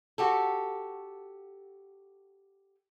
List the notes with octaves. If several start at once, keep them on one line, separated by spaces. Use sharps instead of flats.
F#4 G4 A4